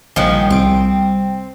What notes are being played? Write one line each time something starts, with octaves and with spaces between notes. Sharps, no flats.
A#1 D#3 F3 G3 C#4 F#5 G5
C2 C4 D7